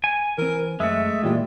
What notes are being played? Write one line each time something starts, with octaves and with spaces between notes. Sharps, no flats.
G#5
E3 C4 A#4
F#2 G#3 A3 E5
A#2 E3 G3 F4